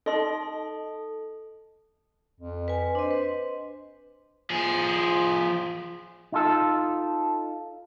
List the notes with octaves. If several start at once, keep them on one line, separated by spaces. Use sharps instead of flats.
D#4 A4 D#5 C6
F2
B4 G#5
D4 C5 D#5
B4
F3 G#4
D#4 F4 A4